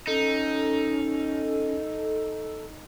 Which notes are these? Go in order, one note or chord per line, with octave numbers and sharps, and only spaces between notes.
C#4 D#4 A4